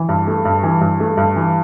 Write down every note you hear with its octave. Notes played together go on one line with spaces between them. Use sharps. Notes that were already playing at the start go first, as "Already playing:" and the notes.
Already playing: E3
G2
A3
G2
E3
G2
A3
G2
E3